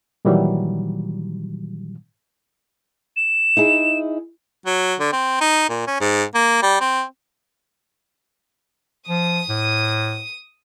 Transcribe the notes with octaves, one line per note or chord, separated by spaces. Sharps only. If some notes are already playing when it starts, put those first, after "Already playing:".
A#2 D#3 E3 F#3 G3
E7
D#4 E4 G#4
F#3
D3
C4
D#4
A#2
C#4
G#2
A#3
G3
C4
F3 D#6 D#7
A2